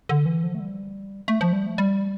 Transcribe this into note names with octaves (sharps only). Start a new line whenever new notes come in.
D3
E3
F3
A3
G3
A3
F3
G3
A3
G3